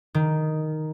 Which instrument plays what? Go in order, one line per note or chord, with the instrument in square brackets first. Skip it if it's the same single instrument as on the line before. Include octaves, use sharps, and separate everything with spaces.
[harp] D#3